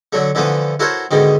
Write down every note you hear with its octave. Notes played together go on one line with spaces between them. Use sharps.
D3 F#3 A3
D3 E3 F3 A3 B3
E4 F#4 A4 A#4 C5 C#5
G#2 B2 D3 D#3